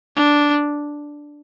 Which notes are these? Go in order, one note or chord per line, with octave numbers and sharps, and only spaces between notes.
D4